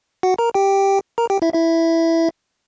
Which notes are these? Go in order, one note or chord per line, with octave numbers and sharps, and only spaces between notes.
F#4 F#5
A#4 A#5
G4 G5
A#4 A#5
G4 G5
E4 E5
E4 E5